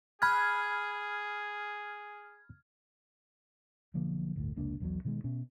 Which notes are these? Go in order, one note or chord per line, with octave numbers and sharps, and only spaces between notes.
G#4 B5 F6 F#6 G#6
B1 D3 F3 A#3
G1 D2 A2
F1 C#2 A#3 D4
B1 E2 B2 F#3
B2 D#3 G3 G#3
B2 C#4